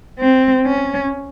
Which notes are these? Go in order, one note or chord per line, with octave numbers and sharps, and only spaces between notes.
C4
C#4